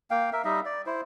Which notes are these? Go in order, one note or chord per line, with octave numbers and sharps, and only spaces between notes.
A#3 F5 G5
A#4 E5
G3 D#4 D#5 E5
D5
E4 C5